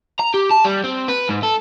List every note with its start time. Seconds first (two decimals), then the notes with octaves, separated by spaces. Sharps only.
0.20 A#5
0.34 G4
0.51 A5
0.65 G3
0.84 C4
1.08 B4
1.30 G#2
1.44 A4